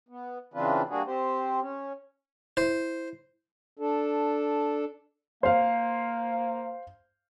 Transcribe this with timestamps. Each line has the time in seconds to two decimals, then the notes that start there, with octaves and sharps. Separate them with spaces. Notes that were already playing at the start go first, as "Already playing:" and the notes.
0.09 B3
0.54 C#3 E3 C4 D4 F4 B4
0.89 G3 A#3 D4 F#4 G#4
1.07 C4 G4 C5
1.61 C#4
2.57 E4 C5
3.79 D4 A4
5.43 A#3 C5 F5